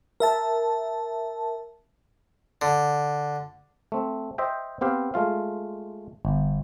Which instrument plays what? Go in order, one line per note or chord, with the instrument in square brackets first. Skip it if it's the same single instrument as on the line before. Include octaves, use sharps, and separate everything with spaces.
[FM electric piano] A#4 E5 A5
[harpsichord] D3
[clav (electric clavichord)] A3 C4
C5 D#5 E5 G5
B3 C4 G4 F5
G#3 A3 F4 F5
G1